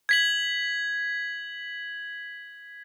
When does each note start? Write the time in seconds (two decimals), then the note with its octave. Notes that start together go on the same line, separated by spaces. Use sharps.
0.09 G#6 B6 F#7